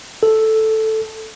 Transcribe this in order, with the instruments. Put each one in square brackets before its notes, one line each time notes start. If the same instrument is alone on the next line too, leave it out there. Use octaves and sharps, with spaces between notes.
[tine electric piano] A4